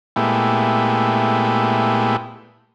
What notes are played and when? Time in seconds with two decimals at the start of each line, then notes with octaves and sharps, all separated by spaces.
0.16 A#2 G#3 A3 B3 E4 G4